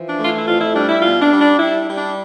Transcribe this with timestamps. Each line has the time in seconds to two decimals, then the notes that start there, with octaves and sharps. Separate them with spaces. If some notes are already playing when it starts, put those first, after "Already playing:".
Already playing: E3 F3
0.08 D4
0.18 A3 F4
0.27 E4
0.37 E4
0.46 F2 F4
0.60 E4
0.75 G3 D4
0.89 E4
1.02 B2 F4
1.22 D4
1.31 G3
1.40 D4
1.59 G3 E4
1.88 G3
1.97 D4